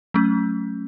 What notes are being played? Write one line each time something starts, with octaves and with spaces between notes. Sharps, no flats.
F#3 A3 C#4